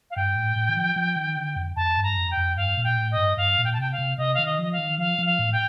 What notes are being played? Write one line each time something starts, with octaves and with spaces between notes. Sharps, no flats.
F5
G2 G5
A2
A2
D#3
F3
F3
D#3
D3
F2
F2 A5
G2
A#5
F2
G5
F2
G2 F5
A#2
G5
A2
D#5
G2
G2 F5
A#2
G5
A5
C3 G5
F5
C3
C3 D#5
D#3 F5
D#5
F3 D#5
F5
D#3
F3 F5
F3
F5
A2
G5